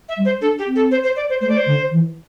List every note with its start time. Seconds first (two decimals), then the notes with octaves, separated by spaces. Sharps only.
0.09 E5
0.17 G3
0.25 C5
0.41 D4 A4
0.59 G4
0.67 C4
0.76 A4
0.91 C5
1.04 C5
1.16 D5
1.29 C5
1.41 A3 C5
1.49 D5
1.57 C5
1.66 D3
1.91 E3